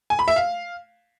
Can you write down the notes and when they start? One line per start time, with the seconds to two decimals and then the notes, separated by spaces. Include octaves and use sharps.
0.10 G#5
0.19 B5
0.28 E5
0.36 F5